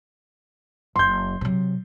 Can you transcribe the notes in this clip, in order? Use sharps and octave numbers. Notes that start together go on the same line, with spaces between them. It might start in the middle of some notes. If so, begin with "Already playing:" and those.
F#1 C6 G6
C3 F#3